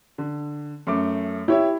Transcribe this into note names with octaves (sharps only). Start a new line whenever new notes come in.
D3
F#2 A3 D6
E4 G4 C#5 E5